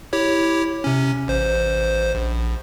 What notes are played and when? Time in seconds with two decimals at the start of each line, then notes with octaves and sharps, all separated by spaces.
0.13 E4 G4 C#5
0.84 C3 C#4
1.28 A1 C5
2.15 A#1